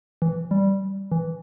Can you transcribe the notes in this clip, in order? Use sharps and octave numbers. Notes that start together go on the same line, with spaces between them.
E3
G3
E3